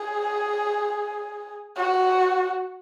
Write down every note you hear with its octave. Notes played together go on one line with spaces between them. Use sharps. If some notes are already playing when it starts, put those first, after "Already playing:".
Already playing: G#4
F#4